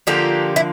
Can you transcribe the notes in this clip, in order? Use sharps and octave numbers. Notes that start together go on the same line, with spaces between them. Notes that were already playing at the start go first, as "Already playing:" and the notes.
D3 F3 A#3 G4
E4